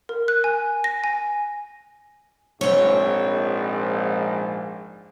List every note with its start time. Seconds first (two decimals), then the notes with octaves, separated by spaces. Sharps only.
0.09 A#4
0.28 F#6
0.44 G#5
0.84 A#6
1.04 G#5
2.61 A#1 G#2 C4 C#5